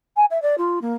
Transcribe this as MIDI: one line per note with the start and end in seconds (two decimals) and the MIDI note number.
0.16 0.25 80
0.30 0.40 76
0.42 0.55 74
0.57 0.79 65
0.81 0.94 58